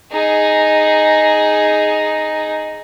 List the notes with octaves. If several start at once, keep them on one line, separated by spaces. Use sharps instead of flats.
D#4 G#4